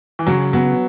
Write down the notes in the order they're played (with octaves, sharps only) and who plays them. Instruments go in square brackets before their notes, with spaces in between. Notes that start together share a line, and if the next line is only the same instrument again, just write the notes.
[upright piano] E3
[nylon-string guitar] C#3 [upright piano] F#3
[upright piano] F#3 [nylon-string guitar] B3